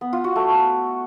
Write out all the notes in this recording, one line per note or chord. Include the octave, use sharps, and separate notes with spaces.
B3
F4
F#4
A3